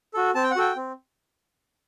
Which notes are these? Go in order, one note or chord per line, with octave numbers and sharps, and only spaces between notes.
F#4 A4
C4 A5
G5
F#5
F#4 A4 G5
C4